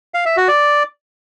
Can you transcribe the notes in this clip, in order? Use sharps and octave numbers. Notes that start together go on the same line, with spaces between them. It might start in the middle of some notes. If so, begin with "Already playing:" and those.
F5
E5
F#4
D5